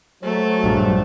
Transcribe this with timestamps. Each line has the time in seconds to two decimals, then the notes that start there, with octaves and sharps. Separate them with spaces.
0.23 F#3 A3 C5
0.64 A#1 G2